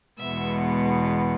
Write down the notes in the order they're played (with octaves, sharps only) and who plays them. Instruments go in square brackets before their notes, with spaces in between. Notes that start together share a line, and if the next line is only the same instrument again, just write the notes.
[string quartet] E2 B2 G#3 B3 E5